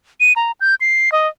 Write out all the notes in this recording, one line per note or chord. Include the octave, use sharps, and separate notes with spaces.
D#7
A#5
G6
C7
D#5